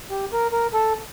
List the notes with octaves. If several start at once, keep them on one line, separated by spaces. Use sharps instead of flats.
G4
A#4
A#4
A4